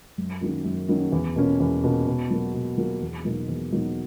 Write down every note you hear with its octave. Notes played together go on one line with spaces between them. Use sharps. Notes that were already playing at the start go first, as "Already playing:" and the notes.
F#2
D#3 F#3 A#3 C#4
F#2
D#3 F#3 A#3 C#4
E2
B2 A#3 C#4
E2
B2 A#3 C#4
B2
F#3 A#3
B2
F#3 A#3
E2
B2 F#3 A#3 D#4
E2
B2 F#3 A#3 D#4